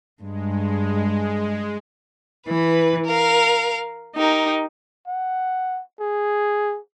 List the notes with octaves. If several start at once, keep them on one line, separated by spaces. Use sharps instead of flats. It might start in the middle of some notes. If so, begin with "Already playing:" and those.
G2 G#3
E3 B4
A#4 F5
D#4 G4 A#4
F#5
G#4